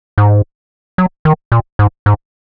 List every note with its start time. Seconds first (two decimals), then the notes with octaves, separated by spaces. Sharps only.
0.18 G#2
0.98 F#3
1.25 D#3
1.52 A#2
1.79 G#2
2.06 G#2